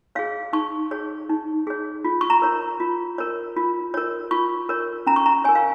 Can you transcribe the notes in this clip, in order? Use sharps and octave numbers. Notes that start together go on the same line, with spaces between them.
G#4 C#5 F5
D#4 C#6
G#4 C#5
D#4
G#4 C#5
F4
C#6
A#5
A#4 C#5
F4
A#4 C#5
F4
A#4 C#5
F4 C#6
A#4 C#5
C#4 A#5
C#6
A#5
A#4 C#5 G#5
F5